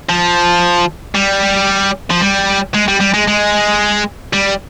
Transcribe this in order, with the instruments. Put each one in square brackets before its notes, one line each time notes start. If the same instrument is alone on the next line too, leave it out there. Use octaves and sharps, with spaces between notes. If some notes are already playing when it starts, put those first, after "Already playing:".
[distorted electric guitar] F3
G3
F3
G3
G#3
G3
G3
G#3
G#3
G3